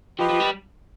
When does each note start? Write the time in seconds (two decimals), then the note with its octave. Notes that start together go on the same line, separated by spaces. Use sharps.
0.19 F3 G4 B4 D#5
0.30 F3
0.40 G3